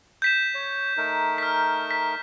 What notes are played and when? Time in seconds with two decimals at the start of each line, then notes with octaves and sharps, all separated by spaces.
0.22 G6 B6 E7
0.55 C#5
0.97 A3 D#4 A#4
1.38 F6 B6
1.91 B6